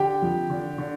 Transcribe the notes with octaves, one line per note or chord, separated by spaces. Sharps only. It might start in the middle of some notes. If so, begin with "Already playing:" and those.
Already playing: D3 G4 G5
F2
D3
D3